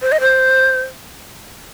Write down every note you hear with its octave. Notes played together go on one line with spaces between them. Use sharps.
C5
D#5
C5